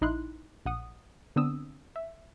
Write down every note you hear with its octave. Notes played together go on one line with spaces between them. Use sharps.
A#1 D#4 E4 C6 F#6
A#1 F#5 D#6
D3 B3 C4 D4 D#6 E6
E5